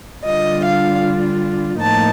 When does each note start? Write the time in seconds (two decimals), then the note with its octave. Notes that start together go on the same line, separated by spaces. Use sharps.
0.24 D3 G3 D4 F4 D#5
0.64 F5
1.82 A2 F3 A#3 D#4 A5